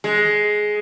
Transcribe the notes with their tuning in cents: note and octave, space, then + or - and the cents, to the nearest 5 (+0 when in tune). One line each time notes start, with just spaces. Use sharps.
G#3 +10